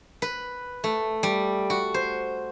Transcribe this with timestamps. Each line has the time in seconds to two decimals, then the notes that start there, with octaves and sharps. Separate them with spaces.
0.22 B4
0.84 A3
1.23 G3
1.70 F#4
1.94 C5